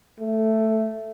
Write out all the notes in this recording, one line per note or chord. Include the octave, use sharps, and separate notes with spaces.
A3